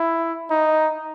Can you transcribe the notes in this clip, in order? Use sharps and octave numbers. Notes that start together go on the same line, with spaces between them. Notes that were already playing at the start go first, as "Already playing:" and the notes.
Already playing: E4
D#4